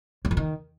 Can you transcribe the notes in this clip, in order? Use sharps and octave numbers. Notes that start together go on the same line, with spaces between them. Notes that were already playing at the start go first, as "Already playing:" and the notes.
F#2
F2
D#3